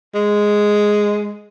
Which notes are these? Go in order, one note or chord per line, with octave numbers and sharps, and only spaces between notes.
G#3